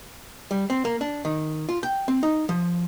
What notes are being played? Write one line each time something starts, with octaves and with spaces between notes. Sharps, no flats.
G3
C4
A#3
D4
D#3
F4
G5
C4
D#4
F3